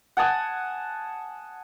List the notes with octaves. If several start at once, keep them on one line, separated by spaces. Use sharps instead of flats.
F#5 G#5 A5 D#6